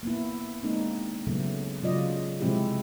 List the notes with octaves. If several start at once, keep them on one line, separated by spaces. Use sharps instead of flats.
A#3 B3 E4
G#3 A#3 C4 D4 D#4
C#3 F#3 A3 B3
C#3 F#3 F4 D5 D#5
C3 F3 G#3 C4 E4 G4